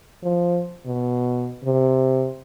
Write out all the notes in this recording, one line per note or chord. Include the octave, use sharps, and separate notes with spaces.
F3
B2
C3